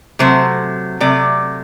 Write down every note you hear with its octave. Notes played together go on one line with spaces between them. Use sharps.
C3 F#3 A3 C5
C3 F#3 A3 D5